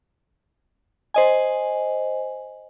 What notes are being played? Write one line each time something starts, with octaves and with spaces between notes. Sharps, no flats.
C5 D#5 G#5